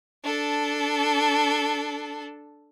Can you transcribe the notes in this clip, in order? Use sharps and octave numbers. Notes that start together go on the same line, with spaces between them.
D4 A4